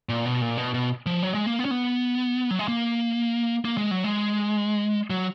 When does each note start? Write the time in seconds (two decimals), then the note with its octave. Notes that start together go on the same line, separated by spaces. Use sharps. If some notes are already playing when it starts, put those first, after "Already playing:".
0.09 A#2
0.25 B2
0.41 A#2
0.57 B2
0.74 B2
1.06 F3
1.22 F#3
1.34 G#3
1.46 A#3
1.59 B3
1.65 C#4
1.71 B3
2.51 F#3
2.59 G#3
2.68 A#3
3.65 A#3
3.78 G#3
3.91 F#3
4.04 G#3
5.10 F#3